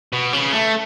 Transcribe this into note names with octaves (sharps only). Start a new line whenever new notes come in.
B2
C#3
A3